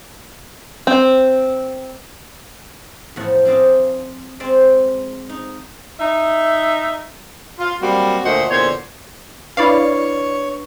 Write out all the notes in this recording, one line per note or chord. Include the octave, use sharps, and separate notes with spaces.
C4
E2 A2 F3 A#4 F#5
C4 D4 G#4 D5 D#5 F5
G#3 C4 D5
D#4
D#4 E5
F4
F#3 G3 A#3 C4 F#4
D2 A#2 A3 C5 D#5 F#5
E2 A#2 D3 C5 C#5
D4 E4 B4 C#5 D5 F5